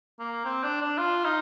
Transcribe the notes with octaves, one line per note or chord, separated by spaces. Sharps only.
A#3
C4
D4
D4
F4
D#4